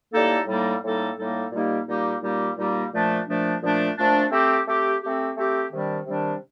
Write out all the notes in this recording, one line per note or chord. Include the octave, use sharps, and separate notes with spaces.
A2 G3 A#3 D#4 A4
A2 G3 A#3 D#4 A4
A2 G3 A#3 D#4 A4
A2 G3 A#3 D#4 A4
A#2 G3 A#3 D#4 G4
A#2 G3 A#3 D#4 G4
A#2 G3 A#3 D#4 G4
A#2 G3 A#3 D#4 G4
A#2 F3 A3 D4
A#2 F3 A3 D4
A#2 F3 A3 D4
A#2 F3 A3 D4
A3 C4 G4
A3 C4 G4
A3 C4 G4
A3 C4 G4
C3 D#3 G3 D4
C3 D#3 G3 D4